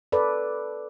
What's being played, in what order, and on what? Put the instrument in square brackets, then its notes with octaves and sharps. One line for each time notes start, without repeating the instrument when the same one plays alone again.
[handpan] A4 B4 D5